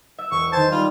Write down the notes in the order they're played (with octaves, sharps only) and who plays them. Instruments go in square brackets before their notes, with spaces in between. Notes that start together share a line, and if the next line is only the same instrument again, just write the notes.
[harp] E5
[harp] E1 [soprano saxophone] C#6
[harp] D#3 G#5 [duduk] C5 [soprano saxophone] A5
[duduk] G3 [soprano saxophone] F4